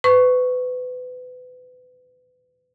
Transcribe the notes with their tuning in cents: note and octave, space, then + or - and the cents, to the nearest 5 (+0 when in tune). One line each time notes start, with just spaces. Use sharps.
B4 +30 C#6 +0